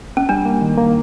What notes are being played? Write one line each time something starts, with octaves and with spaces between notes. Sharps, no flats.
C#4
G3 D4
A#3
D#3
A#3